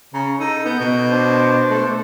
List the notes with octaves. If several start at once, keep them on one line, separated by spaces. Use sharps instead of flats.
C#3 A#5
D#4 A4
B3 G6
B2
D4 C5
A3